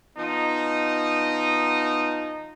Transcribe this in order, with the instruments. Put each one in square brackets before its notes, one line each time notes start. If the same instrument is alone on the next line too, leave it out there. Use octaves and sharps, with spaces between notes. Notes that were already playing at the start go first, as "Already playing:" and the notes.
[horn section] F3 B3 D#4